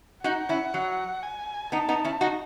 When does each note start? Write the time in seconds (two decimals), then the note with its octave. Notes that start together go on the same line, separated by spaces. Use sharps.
0.24 D#4 F#4 F#5
0.49 C#4 E4
0.74 F#3
1.23 G#5
1.72 B3 D#4 A5
1.88 B3 D#4
2.04 C#4 E4
2.21 D#4 F#4